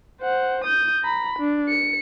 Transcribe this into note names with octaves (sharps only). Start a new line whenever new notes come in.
C5 F#5
D#6 G6
A#5 B5
D4
C#7